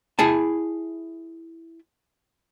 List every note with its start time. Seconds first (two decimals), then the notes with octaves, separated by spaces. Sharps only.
0.19 E4 G#4 G#5 A5